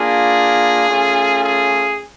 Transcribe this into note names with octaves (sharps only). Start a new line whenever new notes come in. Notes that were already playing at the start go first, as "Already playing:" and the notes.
Already playing: A#3 D4 F4 G#4
A3 C#4 F4
G#4